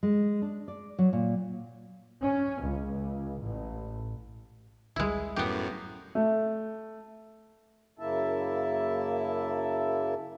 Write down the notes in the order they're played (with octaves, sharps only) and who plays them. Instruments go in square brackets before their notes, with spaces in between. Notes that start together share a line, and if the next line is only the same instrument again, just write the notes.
[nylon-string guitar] G#3
D4
D5
F#3
A#2
[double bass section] C#4
C#2
A1
[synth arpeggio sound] A1 D2 G3 [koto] G#3 E4
[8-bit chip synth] F#2 A2 [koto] B3 G4
[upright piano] A3
[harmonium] F#2 C#3 A#3 E4 E5 A5